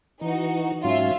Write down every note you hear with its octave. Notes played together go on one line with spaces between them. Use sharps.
E3 D#4 F#4
G#2 F#3 C#4 F4 E5